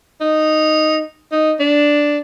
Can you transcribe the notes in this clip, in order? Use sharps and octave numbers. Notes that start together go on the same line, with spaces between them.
D#4
D#4
D4